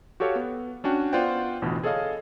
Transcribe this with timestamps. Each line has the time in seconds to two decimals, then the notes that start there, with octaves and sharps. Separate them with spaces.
0.20 F#4 G4 A4 C#5 F5
0.36 B3
0.84 C#4 D4 F#4 G5
1.13 B3 F4 C5 D5 F#5 G5
1.62 A1 D2 B2 E3 B5
1.84 G#4 A4 C#5 D#5 F5